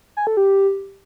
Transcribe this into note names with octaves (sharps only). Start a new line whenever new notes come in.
G#5
A4
G4